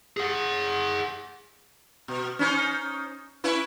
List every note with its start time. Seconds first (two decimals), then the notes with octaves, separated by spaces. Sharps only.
0.17 G#4 F#5
2.08 B2
2.39 C#4 D#4 C5
3.44 C#4 E4 B4